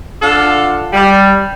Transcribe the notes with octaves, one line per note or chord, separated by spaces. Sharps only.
D4 F4 A4 F5 F#5
G3